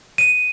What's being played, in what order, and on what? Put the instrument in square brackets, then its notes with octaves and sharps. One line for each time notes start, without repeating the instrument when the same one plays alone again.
[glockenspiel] D#7